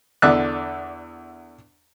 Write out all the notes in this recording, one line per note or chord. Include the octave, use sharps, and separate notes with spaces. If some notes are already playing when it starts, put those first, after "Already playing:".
E2 D3 D5 E5 F#6